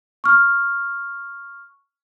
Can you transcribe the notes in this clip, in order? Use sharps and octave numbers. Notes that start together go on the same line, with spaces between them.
C#6 F6